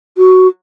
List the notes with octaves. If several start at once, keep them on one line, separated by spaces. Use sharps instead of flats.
F#4